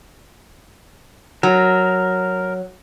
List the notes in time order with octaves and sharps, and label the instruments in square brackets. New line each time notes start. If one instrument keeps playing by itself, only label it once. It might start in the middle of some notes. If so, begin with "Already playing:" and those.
[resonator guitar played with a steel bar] F#3 [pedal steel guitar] A#4